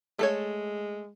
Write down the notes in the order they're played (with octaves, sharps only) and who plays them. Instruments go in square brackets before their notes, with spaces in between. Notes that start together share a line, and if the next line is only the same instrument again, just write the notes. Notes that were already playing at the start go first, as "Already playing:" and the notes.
[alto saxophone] G#3 [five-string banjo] A3 A4 C#5